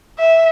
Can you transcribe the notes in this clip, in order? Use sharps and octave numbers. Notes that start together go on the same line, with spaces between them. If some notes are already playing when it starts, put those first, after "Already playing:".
E5